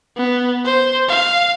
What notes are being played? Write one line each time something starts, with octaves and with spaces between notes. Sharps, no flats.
B3
C5
F5